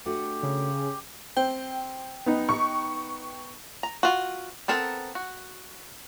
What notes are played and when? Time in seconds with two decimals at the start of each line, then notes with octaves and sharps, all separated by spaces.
0.06 A3 D4 F#4 G4
0.43 C#3
1.37 C4 G5
2.26 B3 D#4
2.49 C#6
3.83 A#5
4.03 F4 F#4
4.68 B3 C4 A4 A#4
5.15 F#4